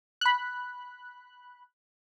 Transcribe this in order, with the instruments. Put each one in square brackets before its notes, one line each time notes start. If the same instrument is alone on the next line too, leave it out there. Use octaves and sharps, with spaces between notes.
[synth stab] B5 F#6